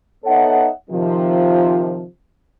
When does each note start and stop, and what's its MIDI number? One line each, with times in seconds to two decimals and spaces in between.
0.25 0.68 59
0.25 0.68 63
0.25 0.68 69
0.25 0.68 73
0.25 0.68 76
0.25 0.68 78
0.90 2.04 48
0.90 2.04 51
0.90 2.04 53